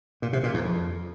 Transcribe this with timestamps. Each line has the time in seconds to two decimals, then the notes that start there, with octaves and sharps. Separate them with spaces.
0.22 A#2
0.33 C3
0.43 A#2
0.54 E2
0.64 F2